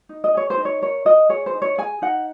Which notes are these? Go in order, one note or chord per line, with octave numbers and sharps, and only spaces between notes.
D#4
D#5
G#4 C#5
C5
D#4
C#5
A#4 C#5
F4 D#5
G#4 C#5
C5
D#4
C#5
G#4 G#5
D#4 F#5